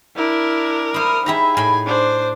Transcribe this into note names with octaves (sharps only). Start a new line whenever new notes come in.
D4 E4 A#4
E4 C5 D#6 F6
D#4 E4 G4 G#4 E5 A#5
A2 G5 G#5 B5
D4 C5